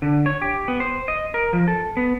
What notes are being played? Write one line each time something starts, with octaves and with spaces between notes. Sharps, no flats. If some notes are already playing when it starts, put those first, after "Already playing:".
D3
C#5
G4
B3
C5
D#5
A#4
F3
A4
B3